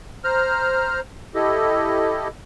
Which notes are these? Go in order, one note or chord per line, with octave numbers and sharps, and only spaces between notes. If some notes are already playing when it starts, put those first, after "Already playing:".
C5 A#5 F6
E4 G4 A4 D#5